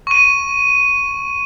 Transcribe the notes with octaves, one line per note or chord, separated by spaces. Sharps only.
C#6 D#7